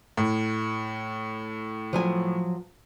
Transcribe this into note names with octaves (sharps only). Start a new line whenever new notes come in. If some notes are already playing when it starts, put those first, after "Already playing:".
A2
F3 F#3 G#5